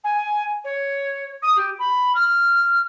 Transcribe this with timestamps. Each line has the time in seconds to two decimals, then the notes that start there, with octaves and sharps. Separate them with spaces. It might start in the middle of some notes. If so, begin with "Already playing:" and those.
0.04 G#5
0.64 C#5
1.42 D#6
1.56 G4
1.78 B5
2.14 F6